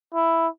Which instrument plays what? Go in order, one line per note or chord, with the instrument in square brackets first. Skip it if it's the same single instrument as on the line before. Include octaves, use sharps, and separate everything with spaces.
[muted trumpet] E4